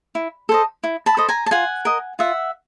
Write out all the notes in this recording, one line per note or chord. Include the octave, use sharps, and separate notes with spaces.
E4
A4 C5 D#5
E4
A5 B5
A4 C5 D#5
G#5 A#5
A5
F4 F#5 G#5
A#4 D#5
F4 E5 F#5